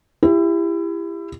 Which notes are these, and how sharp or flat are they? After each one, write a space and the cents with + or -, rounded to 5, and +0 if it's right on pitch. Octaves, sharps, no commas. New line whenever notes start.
E4 +25 G4 +30